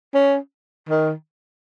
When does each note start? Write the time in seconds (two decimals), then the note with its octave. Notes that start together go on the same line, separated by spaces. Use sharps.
0.14 C#4
0.89 D#3